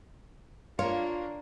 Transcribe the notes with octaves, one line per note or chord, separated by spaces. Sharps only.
A#3 D4 F4 C#5